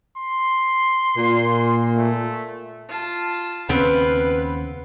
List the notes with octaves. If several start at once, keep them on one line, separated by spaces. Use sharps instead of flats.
C6
A#2
A3
F4 A5
D#2 C#3 B3 C4 B4 F5